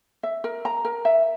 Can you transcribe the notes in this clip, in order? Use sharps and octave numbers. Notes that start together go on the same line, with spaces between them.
E5
A#4
A#5
A#4
E5